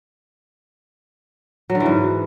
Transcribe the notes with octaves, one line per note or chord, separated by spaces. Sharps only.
F#3
D3
E3
G#2